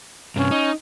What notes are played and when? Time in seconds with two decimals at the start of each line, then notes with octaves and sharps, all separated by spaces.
0.36 G2 C3 C#4
0.51 D#4